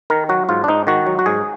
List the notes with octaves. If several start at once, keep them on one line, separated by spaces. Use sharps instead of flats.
D#3 A#4
F#3 F#4
G#2 F4
D4
G#2 D#4
D#3 F#4
F#3
F#4
G#2 G#4